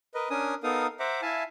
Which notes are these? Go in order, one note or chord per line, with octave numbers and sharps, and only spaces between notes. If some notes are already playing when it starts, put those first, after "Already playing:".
A#4 B4 D#5
C#4 D4 A#4 G#5 D#6
B3 D#4 A4 A#4 F5 D#6
C5 E5 F#5 A#5 D6
E4 E5 F5 G#5 A5